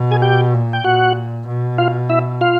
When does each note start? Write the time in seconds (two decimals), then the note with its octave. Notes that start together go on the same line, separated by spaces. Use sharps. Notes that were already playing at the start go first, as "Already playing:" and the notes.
Already playing: B2
0.11 G#4 G#5
0.22 G4 G5
0.53 A#2
0.73 G5
0.84 A#2 F#4 F#5
1.48 B2
1.78 F4 F5
2.09 E4 E5
2.41 F4 F5